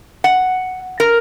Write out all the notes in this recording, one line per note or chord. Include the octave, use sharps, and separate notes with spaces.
F#5
A#4